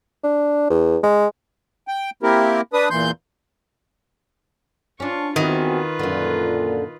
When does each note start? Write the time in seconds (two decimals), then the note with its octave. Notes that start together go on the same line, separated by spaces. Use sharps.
0.24 D4
0.70 E2
1.03 G#3
1.88 G5
2.23 A#3 C4 E4 G4 A#4
2.73 D4 B4 D#6
2.90 E2 A#2 E3 C6 G6
5.00 C#4 D4 F4 C#6
5.36 E2 D#3 E3 B3 C4 F4 F#4 B4
5.99 F#2 A#2 D3